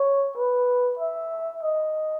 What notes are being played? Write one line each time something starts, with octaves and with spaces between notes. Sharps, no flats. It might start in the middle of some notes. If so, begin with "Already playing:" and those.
Already playing: C#5
B4
E5
D#5